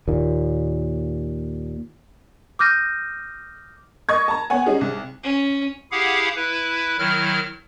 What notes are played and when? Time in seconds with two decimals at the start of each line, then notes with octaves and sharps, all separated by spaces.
0.08 D#2 A#2
2.59 D6 D#6 F6 G6 A#6 D#7
4.09 D#5 C#6 G#6
4.28 A5 A#5
4.50 B3 C#5 F#5 G#5
4.66 G3 C#4 D#4 G#4
4.81 C2
5.23 C#4
5.92 E4 G4 G#4 F5 F#5
6.36 E4 B4
6.98 D#3 F#3 E4 F6